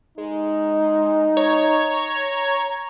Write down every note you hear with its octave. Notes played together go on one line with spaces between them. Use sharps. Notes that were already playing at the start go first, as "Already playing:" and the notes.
G#3 D#4
C#5 A#5